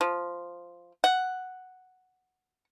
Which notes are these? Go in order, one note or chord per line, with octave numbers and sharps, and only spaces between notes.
F3
F#5